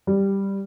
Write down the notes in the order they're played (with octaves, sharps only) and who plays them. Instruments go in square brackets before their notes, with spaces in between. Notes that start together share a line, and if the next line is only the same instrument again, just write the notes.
[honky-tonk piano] G3